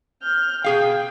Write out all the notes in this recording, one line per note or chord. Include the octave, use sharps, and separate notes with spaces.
F6 G6
B2 G#4 F5 G5